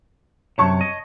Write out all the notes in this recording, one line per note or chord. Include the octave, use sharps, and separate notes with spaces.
F#2 C3 C#5 A5 C#6
D#5